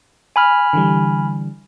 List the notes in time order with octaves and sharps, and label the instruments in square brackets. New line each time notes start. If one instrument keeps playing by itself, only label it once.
[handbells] G#5 B5 F6
[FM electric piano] D3 E3 G3